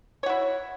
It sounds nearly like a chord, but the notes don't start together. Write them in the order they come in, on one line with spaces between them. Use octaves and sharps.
C#5 F#4 E4